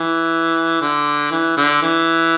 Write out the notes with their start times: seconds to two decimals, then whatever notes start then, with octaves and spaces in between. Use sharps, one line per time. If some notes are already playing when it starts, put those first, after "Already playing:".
Already playing: E3
0.82 D3
1.31 E3
1.57 D3
1.82 E3